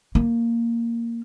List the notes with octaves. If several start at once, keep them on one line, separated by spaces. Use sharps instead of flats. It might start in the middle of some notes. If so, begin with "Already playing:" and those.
A#3